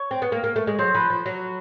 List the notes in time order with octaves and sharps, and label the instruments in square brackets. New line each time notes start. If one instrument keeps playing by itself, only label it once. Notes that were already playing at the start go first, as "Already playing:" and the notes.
Already playing: [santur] C#5
[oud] C4
B3
A#3
A#3
A3
G#3
[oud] F#3 [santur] C5
[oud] F3 [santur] B4
[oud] F3
F#3